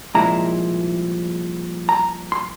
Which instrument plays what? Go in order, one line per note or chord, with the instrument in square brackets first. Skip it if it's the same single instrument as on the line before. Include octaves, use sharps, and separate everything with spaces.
[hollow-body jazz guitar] C2 A#2 F3 G#3 E4 A#5
A#5
C6